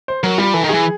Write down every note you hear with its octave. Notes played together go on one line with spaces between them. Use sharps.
C5
F#3 A#4
G3 F4
E3 A4
D#3
E3 G#4